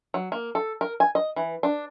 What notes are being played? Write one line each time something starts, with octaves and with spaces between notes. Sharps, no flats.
F#3
A#3
A4
A#4
G#5
D#5
E3
D4